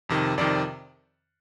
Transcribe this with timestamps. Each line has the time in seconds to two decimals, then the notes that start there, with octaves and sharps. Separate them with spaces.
0.09 F2 C3 D#3
0.38 F2 C3 D#3 D5